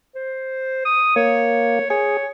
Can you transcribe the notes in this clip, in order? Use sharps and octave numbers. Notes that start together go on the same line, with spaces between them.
C5
D#6
A#3 C#5
G#4 C#5